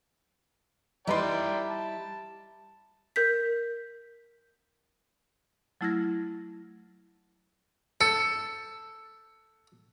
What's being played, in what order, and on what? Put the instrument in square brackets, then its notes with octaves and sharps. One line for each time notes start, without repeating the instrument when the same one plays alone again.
[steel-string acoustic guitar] G3 E4 [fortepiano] D#4 B4 C6 [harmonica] D5 G5 A#5
[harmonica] A5
[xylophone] A#4 G6 B6
[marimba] F#3 A3 E4 F6 G#6 A#6
[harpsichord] A4 [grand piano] C#7